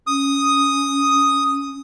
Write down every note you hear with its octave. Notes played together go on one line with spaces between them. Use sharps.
C#4 D#6